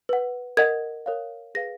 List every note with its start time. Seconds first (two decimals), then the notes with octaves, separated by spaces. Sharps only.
0.09 B4 F#5
0.57 A#4 D#5 F#5 G#6
1.06 A#4 C#5 F5
1.55 G#4 B4 F5 A#6